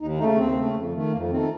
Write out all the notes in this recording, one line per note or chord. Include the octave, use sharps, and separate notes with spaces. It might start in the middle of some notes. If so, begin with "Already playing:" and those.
D#2 D#4
C#3 A3 D#4
D#2 C4
C#3 A3
F2
D#3 A3
F2 A#3
D#3 A3 C4